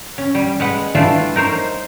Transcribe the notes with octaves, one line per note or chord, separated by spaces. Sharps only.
C#4
G3
G#3 B4 F#5
E3 G3 A3 D4 F4
D#4 A#4 C5 C#5